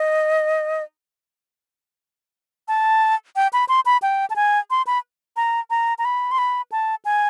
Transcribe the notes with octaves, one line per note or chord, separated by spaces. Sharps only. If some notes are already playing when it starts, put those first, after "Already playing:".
Already playing: D#5
A5
G5
B5
C6
B5
G5
A5
G#5
C6
B5
A#5
A#5
A#5
B5
C6
B5
A5
G#5